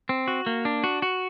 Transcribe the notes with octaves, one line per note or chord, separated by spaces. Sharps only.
C4
F#4
A#3
D4
F#4
F#4